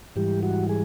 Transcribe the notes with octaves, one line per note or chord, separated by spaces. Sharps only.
G#2 E3 G3 G4
F#4
G#4